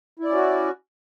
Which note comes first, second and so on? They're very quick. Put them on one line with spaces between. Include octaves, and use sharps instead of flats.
E4 D5 C#4 F#4